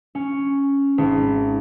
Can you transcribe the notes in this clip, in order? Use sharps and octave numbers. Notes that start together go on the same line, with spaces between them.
C#4
G#1